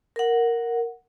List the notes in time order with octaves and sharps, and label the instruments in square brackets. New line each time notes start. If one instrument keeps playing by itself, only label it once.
[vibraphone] A#4 F#5